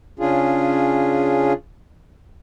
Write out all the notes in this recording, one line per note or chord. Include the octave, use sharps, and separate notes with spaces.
C#3 C#4 D4 F4 G#4